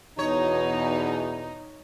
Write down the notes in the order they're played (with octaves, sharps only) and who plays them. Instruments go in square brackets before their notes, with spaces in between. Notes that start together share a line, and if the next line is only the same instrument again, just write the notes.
[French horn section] E2 B2 [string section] D#4 [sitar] C#5